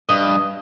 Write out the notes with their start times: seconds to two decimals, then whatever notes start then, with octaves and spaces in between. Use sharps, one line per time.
0.09 G2 D#5